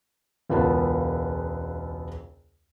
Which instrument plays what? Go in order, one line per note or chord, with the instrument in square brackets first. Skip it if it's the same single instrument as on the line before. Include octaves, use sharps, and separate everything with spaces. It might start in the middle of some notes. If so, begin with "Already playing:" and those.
[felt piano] E1 C#2 B3 F4 A5